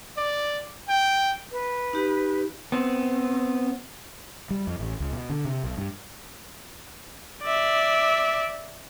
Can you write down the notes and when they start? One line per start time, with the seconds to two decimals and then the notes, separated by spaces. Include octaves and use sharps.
0.18 D5
0.89 G5
1.52 B4
1.93 D#4 G4
2.72 B3 C4
4.51 G3
4.67 F2
4.79 A1
5.00 C#2
5.13 B2
5.30 D3
5.45 C3
5.64 B1
5.78 G2
7.43 D5 E5